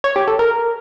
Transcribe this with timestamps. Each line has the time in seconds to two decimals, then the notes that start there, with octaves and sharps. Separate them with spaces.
0.04 C#5
0.16 G4
0.27 A4
0.39 A#4